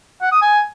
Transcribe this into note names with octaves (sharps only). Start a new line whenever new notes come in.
F#5
D#6
G#5